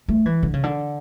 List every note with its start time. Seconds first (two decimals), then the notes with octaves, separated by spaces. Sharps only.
0.08 A3
0.26 E3
0.43 D3
0.53 C#3
0.63 D3